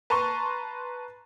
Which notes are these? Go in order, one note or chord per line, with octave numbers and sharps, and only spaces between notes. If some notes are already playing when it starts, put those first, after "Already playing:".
B4 A5 A#5 C6 C#6